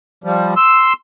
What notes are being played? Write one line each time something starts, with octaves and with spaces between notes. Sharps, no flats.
F3 G3
C6 E6